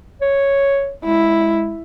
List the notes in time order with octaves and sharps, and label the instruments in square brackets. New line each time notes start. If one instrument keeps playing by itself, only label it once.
[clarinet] C#5
[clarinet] G#3 [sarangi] E4